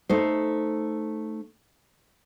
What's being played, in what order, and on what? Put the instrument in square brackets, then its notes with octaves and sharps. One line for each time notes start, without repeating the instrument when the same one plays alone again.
[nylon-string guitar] A3 D#4 C5